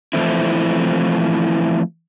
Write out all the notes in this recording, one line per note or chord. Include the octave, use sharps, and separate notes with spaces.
E3 F3 A3 C4 E4